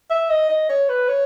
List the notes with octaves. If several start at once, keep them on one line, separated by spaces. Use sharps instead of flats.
E5
D#5
D#5
C#5
B4
C#5